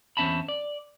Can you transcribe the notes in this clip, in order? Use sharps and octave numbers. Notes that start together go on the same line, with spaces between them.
E2 C4 C#4 E5 A5 B5
D5